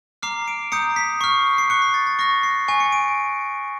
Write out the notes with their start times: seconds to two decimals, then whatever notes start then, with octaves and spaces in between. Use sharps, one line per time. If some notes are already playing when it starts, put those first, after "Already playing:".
0.23 A#5 D6 F6 C7
0.48 D7
0.72 A#5 D#6 G6 C#7
0.96 B6
1.21 C#6 F6 C7
1.58 C7
1.70 C#6 F#6 C#7
1.82 B6
1.94 A6
2.07 A6
2.19 C#6 F6 A#6
2.43 C7
2.68 G#5 C#6 F#6
2.80 C#7
2.92 D7